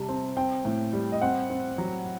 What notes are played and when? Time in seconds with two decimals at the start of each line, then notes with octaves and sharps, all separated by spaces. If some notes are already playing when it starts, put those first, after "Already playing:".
Already playing: C3 G3 A5
0.09 C4
0.37 C4 G5
0.65 A2
0.93 G3
1.12 D#5
1.22 C4 F#5
1.50 C4
1.78 F#3